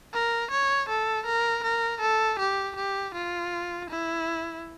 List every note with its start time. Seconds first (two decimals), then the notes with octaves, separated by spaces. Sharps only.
0.14 A#4
0.51 C#5
0.89 A4
1.26 A#4
1.64 A#4
2.00 A4
2.39 G4
2.76 G4
3.14 F4
3.90 E4